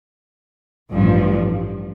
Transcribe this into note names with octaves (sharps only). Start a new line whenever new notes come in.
A1 G2 F3